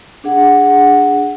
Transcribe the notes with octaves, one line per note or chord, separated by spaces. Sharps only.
D4 G#4 F#5